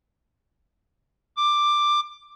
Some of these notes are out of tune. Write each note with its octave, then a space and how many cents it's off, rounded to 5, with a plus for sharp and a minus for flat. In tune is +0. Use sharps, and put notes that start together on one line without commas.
D6 +10